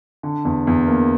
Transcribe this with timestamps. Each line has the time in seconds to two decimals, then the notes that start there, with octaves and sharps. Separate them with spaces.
0.23 D3
0.45 E2
0.67 E2
0.88 A#3